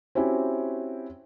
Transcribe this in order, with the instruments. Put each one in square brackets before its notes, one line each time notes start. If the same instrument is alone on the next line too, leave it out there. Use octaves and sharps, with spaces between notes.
[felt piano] C4 C#4 E4 F#4 G4